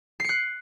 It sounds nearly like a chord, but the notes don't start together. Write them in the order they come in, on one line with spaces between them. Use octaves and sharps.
C7 C#7 F#6